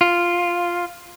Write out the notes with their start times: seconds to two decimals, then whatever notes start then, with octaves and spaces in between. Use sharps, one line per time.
0.01 F4